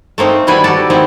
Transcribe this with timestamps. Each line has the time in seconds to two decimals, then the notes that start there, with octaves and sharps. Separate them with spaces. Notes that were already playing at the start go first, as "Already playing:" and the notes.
0.18 A3 A#3 C4 D#4
0.47 B2 D#3 G3 E4 B4 G#5
0.64 F#4 G4 A4 D5
0.90 D#3 B3 C4 E4